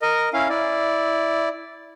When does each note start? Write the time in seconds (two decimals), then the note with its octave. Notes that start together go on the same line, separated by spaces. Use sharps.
0.02 A#4 D#5
0.33 C#4 E4 F5
0.49 E4 D5